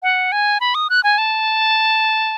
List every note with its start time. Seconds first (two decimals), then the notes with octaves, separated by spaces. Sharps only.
0.03 F#5
0.32 G#5
0.60 B5
0.75 D#6
0.90 F#6
1.04 G#5
1.18 A5